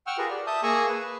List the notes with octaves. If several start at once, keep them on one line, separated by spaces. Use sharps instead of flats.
F#5 G5 C#6 E6 F6
F4 G4 G#4 A#4 B4
D5
E5 A5 D#6 G6
A#3 G#4 G#5 A#5 C#6 E6
B4